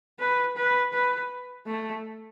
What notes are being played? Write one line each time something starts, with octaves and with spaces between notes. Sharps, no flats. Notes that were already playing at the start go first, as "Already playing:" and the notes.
B4
B4
B4
A3